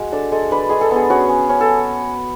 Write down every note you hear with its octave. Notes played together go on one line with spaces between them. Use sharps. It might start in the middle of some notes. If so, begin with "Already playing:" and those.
Already playing: G#3 F#4
D4 A4
G#3 A4
D4 B4
G#3 G#4
A4
B3
G#4
C#4 F#4
C#4
C#4
A4